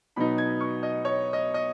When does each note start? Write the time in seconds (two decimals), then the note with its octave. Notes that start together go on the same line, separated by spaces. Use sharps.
0.16 B2 F#3 B3 D#4 B5
0.38 G#6
0.61 C#6
0.83 D#5
1.05 C#5
1.33 D#5
1.54 D#5